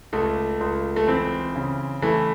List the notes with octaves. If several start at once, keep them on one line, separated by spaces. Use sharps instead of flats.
C#2 A3
C#2
A3
E3 C4
C#3
E3 A3